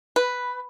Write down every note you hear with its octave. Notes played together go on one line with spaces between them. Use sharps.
B4